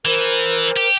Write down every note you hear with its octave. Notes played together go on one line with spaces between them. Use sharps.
E3 A#4 C5
G4